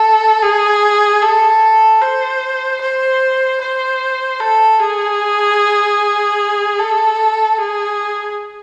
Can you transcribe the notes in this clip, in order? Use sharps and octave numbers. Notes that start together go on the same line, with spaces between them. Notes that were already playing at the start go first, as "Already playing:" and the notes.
Already playing: A4
G#4
A4
C5
C5
C5
A4
G#4
A4
G#4